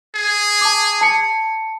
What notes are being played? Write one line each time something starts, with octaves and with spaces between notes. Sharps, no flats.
G#4
A5 D6
A5 C#7